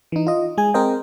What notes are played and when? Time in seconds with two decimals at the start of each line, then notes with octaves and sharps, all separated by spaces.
0.12 E3 D#4
0.27 F4 D#5
0.58 G#3 G#4 G#5
0.74 C4 G#4 A#4 C5 D#5 G5